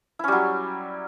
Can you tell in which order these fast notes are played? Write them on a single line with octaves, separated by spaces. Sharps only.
E4 C#4 G3 F#3